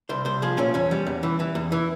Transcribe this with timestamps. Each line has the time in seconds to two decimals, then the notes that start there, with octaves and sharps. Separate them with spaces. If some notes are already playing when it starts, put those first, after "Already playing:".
0.09 C2 C5
0.25 C2 C5
0.42 F3 G#4
0.58 A#2 C#4
0.74 E2 C#4
0.91 G3
1.07 E2
1.23 E3
1.40 E3
1.55 E2
1.72 E3